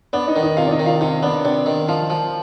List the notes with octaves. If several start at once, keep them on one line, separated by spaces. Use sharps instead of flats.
B3 D4 D5
D#4 D#5
D#3
D#4 D#5
C3 F4 F5
D5
D#4 D#5
D#3
F4 F5
C3 D#4 D#5
B3 D4 D5
C3 D4 D5
D#3
F3 F4 F5
F3